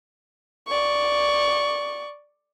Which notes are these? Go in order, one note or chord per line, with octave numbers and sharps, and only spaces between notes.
D5 C#6